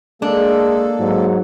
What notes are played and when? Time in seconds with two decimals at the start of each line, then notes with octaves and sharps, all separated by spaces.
0.22 G#3 A#3 D4 G#4 A4
0.99 G#2 F#3